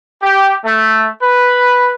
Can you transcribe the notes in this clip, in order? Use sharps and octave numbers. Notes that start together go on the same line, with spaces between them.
G4
A3
B4